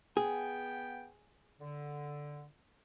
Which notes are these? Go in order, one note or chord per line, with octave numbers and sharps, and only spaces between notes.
B3 G#4 G5
D3